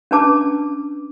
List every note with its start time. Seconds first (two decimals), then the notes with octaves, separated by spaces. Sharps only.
0.11 C#4 D4 B4 A5 D6